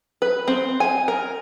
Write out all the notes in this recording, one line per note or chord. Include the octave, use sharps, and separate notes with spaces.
B4
C4
G#5
A#4